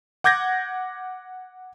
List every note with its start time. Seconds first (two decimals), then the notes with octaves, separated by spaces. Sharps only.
0.24 F#5 D6 G6 G#6 A#6